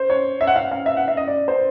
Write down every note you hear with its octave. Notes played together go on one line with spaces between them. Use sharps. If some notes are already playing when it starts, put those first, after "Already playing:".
Already playing: C5
C#5
E5
F#5
F5
F5
E5
F#5
E5
D#5
D5
C5